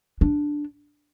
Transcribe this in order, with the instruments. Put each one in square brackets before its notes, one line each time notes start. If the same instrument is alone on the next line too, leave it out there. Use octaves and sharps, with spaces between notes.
[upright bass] D4